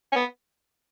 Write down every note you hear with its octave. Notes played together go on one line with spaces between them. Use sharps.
C#4
B3